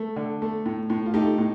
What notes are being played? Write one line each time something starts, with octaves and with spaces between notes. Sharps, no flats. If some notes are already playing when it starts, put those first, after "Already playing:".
Already playing: A3
D3
A3
A2
A2
F4
A3 D#4 G4
A2